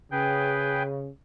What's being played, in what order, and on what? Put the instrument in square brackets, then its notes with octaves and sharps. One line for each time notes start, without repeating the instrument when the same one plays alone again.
[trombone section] C#3 [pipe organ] G#4 B4 G5